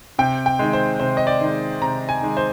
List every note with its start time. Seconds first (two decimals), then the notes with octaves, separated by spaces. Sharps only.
0.19 C3 G5
0.46 G5
0.59 D#3 G#3
0.73 C5
1.00 C3 C5
1.17 D#5
1.27 D5
1.41 D#3 G#3
1.82 C3 A#5
2.09 G#5
2.22 D#3 G#3
2.37 C5